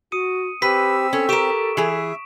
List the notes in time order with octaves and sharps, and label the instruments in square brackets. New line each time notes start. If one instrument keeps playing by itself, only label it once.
[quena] F#4 [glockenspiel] D#6 C#7 D#7
[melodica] C4 E6 [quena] G4 [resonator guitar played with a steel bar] B4 [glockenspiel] B6
[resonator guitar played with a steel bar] C#4 [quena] A4
[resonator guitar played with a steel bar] G4 A#4 [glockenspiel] C#6 D7 E7
[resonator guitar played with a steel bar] E3 G#4 [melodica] E5